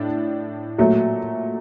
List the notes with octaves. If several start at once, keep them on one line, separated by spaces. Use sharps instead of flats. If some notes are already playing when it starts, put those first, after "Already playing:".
Already playing: A2 D4
A#2 F#3 A3